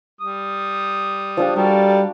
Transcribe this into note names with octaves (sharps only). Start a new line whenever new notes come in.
G3 D#6
F3 D4 G4
G3 F#4 A4 A#4